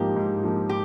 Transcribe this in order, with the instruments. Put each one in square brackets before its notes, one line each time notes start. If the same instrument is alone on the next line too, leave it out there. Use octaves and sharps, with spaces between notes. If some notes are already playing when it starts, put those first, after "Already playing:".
Already playing: [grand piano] G#2 F3 A#3 D#4 [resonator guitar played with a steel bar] G4
[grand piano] G#2
F3 A#3 D#4
[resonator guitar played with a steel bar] G4